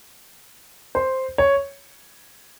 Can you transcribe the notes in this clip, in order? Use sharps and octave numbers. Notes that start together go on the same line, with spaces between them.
C5
C#5